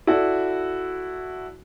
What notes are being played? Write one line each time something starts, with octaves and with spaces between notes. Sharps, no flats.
E4 F#4 A4 D5